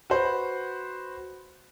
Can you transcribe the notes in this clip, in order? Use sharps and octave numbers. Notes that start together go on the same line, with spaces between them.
F#4 B4 C5